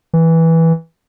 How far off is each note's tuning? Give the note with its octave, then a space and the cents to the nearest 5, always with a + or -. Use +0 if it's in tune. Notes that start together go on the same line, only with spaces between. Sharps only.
E3 -10